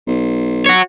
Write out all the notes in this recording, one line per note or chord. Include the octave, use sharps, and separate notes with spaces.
B1
F#4 C#5